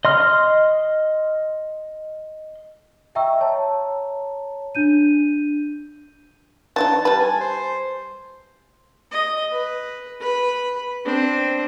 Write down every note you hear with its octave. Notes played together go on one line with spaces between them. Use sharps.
D#5 C6 F6
D#5 E5 G5 A#5 C#6 E6
C#5 A5 A#5
D4 G6 D#7
E3 D4 D#4 A5
G3 B4 A5
G#5
C5
D#5
B4
B4 B5
C4 D4